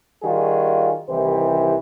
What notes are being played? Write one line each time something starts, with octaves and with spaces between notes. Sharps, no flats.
D#3 G3 F4 F#4 G#4
C2 D#3 E3 G4 C5